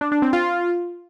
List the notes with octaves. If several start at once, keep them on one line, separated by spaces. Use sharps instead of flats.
D4
D4
C4
F4